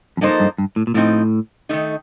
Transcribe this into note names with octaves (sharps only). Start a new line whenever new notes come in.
F2
G2 F3 A#3 D#4 A4 C5
G2
G2
A2
A#2
A2 F3 C4 D#4
D#3 A3 D#4